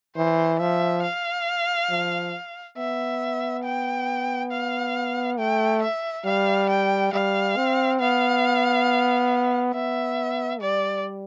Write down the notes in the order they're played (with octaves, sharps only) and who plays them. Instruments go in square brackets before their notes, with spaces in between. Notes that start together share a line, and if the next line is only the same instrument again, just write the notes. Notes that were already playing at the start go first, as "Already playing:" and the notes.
[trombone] E3 [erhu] C5
[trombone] F3 [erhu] E5
[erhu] F5
[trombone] F3
[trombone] B3 [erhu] E5
[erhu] G5
F5
[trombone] A3 [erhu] G5
[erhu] E5
[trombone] G3 [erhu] F5
[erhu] G5
[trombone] G3 [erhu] F5
[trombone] C4
[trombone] B3 [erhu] F5
[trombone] B3 [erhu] E5
[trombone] G3 [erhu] D5